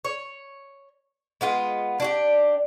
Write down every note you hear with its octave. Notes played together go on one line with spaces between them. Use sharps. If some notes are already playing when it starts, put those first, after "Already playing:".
C#5
G#3 B3 F4
D4 F#4 G4